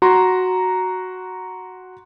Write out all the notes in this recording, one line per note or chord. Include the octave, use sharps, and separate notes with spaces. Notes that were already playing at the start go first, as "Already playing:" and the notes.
F#4 A#5 C6